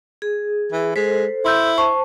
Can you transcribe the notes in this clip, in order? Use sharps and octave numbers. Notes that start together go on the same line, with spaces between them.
G#4
E3
G#3 A4 C5 B6
E4 C6 E6 G6
C5 A5 C#6